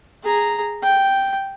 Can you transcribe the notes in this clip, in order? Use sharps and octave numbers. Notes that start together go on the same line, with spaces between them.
G#4 A#5
G5